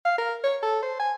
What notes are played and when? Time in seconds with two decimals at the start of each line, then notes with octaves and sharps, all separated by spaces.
0.05 F5
0.18 A#4
0.44 C#5
0.63 A4
0.83 C5
0.99 G#5